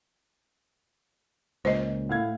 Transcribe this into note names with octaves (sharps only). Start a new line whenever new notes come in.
C#2 A#2 C5 D#5
A2 F5 G#6